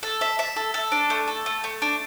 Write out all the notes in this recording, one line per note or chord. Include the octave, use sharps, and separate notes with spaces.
A4
E5
E5
A4
A4
D4
A3
A4
A3
A3
D4